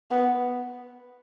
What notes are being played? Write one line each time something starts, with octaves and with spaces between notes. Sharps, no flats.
B3